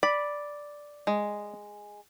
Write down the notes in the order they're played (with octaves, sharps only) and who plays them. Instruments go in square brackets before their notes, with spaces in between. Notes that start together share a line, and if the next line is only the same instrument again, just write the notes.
[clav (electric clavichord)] D5 [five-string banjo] B5
[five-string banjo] G#3